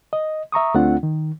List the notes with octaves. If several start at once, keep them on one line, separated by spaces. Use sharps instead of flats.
D#5
E5 A#5 C#6 D#6
D2 A3 C4 D4 F4 F#5
D#3